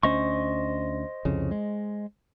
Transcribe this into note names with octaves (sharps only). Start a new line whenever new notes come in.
D2 C#4 C5 D#5 C#6
C2 F2 C#3
G#3